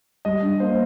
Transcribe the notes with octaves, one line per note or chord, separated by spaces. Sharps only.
G3 D#5
D4
A#3 C5